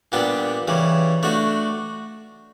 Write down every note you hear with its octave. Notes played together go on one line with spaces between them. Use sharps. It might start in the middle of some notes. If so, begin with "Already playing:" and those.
A#2 G3 B3 D4 G4
C#3 E3 G3
A3 D4 F#4